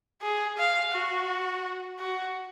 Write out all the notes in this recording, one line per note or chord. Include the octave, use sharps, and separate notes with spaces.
G#4
F5
F#4
F#4